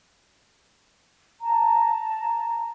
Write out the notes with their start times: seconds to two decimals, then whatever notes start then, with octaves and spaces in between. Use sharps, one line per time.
1.41 A5 A#5